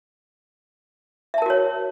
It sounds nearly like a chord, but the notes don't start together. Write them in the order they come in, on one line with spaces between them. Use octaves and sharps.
E5 A5 A#4 F#4 C#5